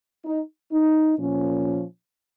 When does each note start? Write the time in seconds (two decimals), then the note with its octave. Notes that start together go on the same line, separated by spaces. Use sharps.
0.25 D#4
0.72 D#4
1.19 A#2 F3 C#4